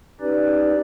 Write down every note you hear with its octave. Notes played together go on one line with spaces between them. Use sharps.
C#4 D#4 G4 B4 D5